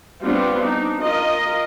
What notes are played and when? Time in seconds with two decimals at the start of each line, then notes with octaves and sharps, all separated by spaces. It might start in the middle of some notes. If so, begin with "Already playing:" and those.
0.24 G3 B3 C4 D4 F4
0.61 D4 D#4
1.01 F4 A#4 D#5